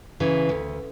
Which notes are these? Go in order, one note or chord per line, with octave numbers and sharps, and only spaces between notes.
C#3 E3
D2